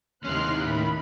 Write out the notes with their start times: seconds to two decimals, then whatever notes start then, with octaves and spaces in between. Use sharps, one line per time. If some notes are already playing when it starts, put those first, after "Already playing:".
0.25 D#2 C3 C#4 D#4 E4 C6 F6 F#6
0.66 A2 D#3 B5